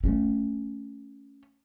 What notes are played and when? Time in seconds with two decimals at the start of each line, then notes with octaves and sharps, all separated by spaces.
0.04 A3 C#4